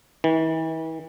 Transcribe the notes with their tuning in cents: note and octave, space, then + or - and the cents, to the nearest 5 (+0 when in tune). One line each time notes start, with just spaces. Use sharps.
E3 -40